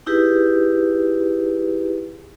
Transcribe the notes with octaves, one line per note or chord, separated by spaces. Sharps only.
D#4 E4 G4 G#4 B4